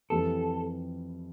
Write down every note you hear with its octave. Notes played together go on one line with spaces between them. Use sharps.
F2 E3 G3 A4